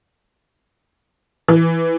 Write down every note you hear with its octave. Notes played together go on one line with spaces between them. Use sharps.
E3